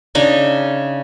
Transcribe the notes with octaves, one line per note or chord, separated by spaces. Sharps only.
C#3 D4 D#4 G#5